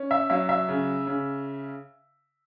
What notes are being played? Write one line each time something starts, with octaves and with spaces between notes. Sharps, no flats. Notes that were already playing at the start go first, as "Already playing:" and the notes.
Already playing: C#4
E5
F#3 E5
E5
C#3
C#3